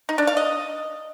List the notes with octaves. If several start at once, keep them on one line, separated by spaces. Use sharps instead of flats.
D#4
D4
F5
D#5